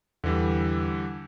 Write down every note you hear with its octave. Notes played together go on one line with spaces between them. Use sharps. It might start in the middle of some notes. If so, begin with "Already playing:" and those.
E2 D3 E3 G3